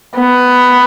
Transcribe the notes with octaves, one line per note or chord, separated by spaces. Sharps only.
B3